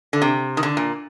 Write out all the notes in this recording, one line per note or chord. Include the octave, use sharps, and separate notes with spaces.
D3
C3
D#3
D3
A#2